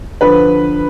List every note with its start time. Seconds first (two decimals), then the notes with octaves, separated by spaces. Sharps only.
0.21 D3 F3 B4